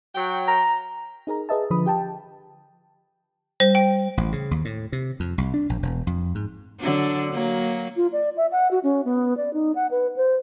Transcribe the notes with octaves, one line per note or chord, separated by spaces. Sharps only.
F#3 G5
A#5
D#4 G#4 A#4 A#5
G#4 B4 D#5 E5 A5
D3 F3 B4 B5 D#6
G4 G5 A5
G3 C5
G5
A1
C#3
D#2
A2
C3
F2
C2
D4
A#1
E1
F2
G#2
D3 F#3 D4
F#3 A#3
F4
D5
E5
F#5
F#4
C#4
B3
D5
D#4
F#5
B4
C5